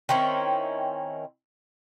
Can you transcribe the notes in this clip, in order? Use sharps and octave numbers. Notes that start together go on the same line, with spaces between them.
D#3 C4 C#4 E4